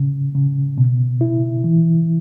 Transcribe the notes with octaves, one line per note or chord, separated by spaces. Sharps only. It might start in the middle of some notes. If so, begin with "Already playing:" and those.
Already playing: C#3
C#3
B2
E4
E3